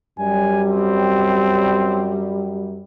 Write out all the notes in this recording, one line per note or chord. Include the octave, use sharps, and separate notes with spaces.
F#2 F#3 G3 G#5
C4